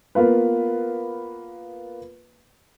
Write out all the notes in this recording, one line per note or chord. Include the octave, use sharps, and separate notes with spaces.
A#3 B3 F4 B4